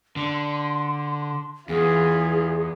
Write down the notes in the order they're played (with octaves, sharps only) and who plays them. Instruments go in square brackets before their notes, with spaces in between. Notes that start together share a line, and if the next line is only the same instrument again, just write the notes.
[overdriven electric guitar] D3 [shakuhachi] C6
[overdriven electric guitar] E2 [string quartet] E3 F4 [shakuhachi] G#4